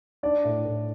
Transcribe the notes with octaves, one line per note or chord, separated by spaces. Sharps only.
D4 D5
A2
A2